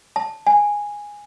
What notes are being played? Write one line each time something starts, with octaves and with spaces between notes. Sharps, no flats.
A5
G#5